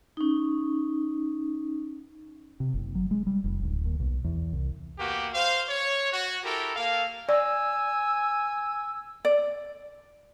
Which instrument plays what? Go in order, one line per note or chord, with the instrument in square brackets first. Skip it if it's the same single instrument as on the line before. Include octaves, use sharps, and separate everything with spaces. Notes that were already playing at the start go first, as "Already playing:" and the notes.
[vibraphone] C#4 D#4
[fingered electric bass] C3
F#1
F#3
G#3
G3
F1
D1
D#2
B1
E2
C2
[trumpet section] A#3 B3 F#4 G4
C5 F5
C#5
F#4
E4 G4 A4 A#4
A#3 A4 F5
[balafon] D5 [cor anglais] G#5 [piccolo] E6
[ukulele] D5